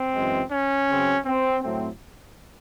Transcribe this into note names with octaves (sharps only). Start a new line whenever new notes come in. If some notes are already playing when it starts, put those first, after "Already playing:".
Already playing: C4
F#2 E3 G#3
C#4
C#3 F#3 C4
C4
A2 F#3 A3 C4